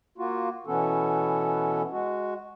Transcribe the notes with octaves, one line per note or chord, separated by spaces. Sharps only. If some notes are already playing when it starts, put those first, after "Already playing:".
A#3 F4 F#4
B2 E3 B3 C#4 A4
G#3 F#4